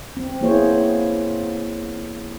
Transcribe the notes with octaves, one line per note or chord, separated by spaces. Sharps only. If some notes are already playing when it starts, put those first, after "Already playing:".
C4
A#3 B3 E4 G#4 C5 C#5